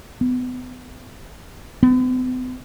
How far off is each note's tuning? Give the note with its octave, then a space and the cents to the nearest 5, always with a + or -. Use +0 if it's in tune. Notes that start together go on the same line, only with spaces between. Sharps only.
B3 +30
B3 +45